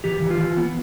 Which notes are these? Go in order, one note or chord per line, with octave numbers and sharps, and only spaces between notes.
E3 G4
E3
F4
E3
B3